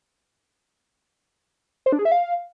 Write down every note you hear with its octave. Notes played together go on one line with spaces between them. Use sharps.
C5
D4
G#4
E5
F5